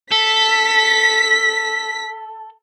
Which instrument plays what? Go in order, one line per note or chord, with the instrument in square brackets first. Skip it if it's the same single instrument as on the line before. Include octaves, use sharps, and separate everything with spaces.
[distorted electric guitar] A4 [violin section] B6